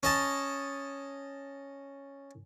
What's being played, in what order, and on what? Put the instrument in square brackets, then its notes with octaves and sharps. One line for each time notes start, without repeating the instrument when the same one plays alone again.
[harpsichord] C#4 D#5 A5